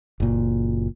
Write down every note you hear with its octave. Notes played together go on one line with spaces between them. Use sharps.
F#1 A#2